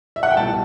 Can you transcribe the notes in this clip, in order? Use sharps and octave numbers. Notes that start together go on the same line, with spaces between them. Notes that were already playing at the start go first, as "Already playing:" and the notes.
E5
F#5
G5
C2 B2 A5